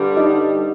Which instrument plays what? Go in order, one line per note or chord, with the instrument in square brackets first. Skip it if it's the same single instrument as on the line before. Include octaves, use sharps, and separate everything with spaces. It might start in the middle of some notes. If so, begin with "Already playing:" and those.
Already playing: [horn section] G2 D3 G3
[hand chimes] D#4 D#5